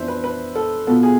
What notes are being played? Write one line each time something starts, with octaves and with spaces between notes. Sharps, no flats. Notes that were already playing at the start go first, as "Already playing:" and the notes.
Already playing: F2 E3 B3 D4 C5 E5
B4
B4
A4
B2 B3 F4 A4
G#4